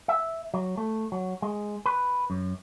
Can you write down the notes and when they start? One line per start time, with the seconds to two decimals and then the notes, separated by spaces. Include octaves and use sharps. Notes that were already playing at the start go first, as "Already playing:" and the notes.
0.08 E5
0.54 F#3
0.77 A3
1.12 F#3
1.42 G#3
1.86 B4
2.30 F#2